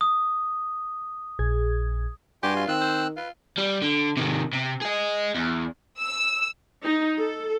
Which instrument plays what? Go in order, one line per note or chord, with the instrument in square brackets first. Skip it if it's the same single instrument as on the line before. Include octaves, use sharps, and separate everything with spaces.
[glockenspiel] D#6
[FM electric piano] A#1 G#4 G#6
[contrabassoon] G2 [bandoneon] F#4 G#5 C6 [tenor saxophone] G4
[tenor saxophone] F4
[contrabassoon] D#3 [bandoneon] C4 E6 F#6
[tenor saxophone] C5
[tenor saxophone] F4 [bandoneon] B4
[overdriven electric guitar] G3
D3
C3 D#3
C3
G#4 D#5
E2
[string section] E6
[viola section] D#4
A4